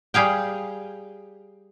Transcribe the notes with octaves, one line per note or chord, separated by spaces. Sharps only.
G3 G#4 F5 G5